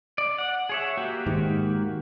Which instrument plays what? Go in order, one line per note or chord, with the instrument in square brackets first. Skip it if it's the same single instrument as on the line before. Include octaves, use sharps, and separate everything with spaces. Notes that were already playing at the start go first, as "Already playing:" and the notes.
[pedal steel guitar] D5
F#5
G#4 C#5 E5
A#3 F#4 G4
[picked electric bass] G#2 D#3